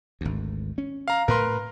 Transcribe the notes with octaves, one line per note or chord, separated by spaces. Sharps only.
G#1 D2
C#4
F5 A#5
A2 A#4 B4 C6